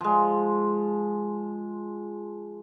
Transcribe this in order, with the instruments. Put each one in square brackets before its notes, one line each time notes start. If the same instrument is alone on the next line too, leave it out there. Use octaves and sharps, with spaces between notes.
[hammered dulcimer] F3 G#3